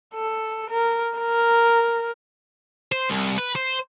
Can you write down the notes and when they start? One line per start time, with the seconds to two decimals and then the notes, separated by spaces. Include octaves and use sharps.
0.14 A4
0.70 A#4
1.18 A#4
2.92 C5
3.09 C2
3.38 B4
3.55 C5